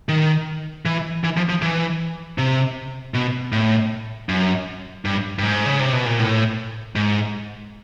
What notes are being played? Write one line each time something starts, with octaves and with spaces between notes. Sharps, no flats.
D#3
E3
E3
F3
F3
E3
C3
B2
A2
F#2
G2
G2
G#2
C#3
C3
B2
A#2
A2
G#2